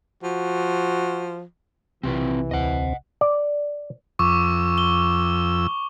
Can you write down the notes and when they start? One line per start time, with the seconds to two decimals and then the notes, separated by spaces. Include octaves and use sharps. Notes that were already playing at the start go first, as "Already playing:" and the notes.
0.23 F3 F#4
2.03 B1 C3 E3 C4 F4 B4
2.51 D2 C4 D#5 F#5
3.21 D5
4.19 F2 C#6 D6 E6
4.78 G7